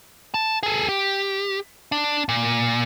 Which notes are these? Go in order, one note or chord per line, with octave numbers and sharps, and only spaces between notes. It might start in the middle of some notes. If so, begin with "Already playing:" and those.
A5
G#4 A4
G4
D4
A#2